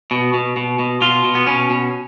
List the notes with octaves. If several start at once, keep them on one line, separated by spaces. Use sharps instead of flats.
B2
B2
B2
B2
B2 F4
B2
B3
B2 C#4
B2